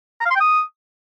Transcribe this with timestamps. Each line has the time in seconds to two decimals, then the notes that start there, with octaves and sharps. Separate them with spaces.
0.21 A#5
0.26 F5
0.31 C6
0.36 G5
0.41 D#6